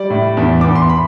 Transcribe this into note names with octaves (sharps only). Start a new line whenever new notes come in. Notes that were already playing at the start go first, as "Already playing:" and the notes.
Already playing: G3 D5
A2
E2
E2 D6
C6
B5